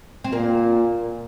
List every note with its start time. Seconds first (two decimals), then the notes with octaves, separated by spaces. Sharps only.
0.24 C4
0.33 A#2 A#3